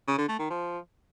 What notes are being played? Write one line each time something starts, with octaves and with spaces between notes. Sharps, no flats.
C#3
D3
A3
D#3
F3